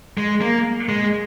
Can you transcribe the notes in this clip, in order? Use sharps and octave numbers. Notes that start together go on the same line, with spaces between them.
G#3
A#3
G#3